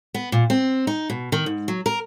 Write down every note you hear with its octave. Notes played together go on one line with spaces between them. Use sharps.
B3
A#2
C4
D#4
B2
D#3
G#2
F#3
A#4